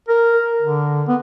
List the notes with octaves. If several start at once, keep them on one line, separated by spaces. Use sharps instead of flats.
A#4
D3
B3